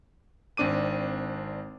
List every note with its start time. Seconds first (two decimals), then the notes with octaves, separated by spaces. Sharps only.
0.57 G#1 C4 D4 D6 D#7